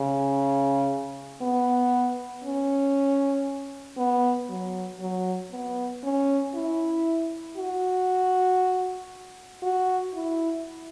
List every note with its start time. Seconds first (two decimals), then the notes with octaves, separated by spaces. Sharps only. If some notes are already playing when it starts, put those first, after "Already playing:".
Already playing: C#3
1.42 B3
2.44 C#4
3.98 B3
4.49 F#3
5.00 F#3
5.51 B3
6.04 C#4
6.54 E4
7.57 F#4
9.63 F#4
10.14 E4